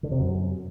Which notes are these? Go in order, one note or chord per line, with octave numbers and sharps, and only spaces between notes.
D3
C3
F#2